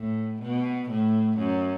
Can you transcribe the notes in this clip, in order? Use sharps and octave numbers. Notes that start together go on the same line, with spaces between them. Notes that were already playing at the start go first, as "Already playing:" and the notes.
Already playing: A2
B2
A2
F#2